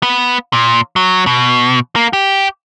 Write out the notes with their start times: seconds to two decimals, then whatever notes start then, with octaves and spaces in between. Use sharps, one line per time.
0.03 B3
0.53 A#2
0.96 F#3
1.27 B2
1.96 A#3
2.13 G4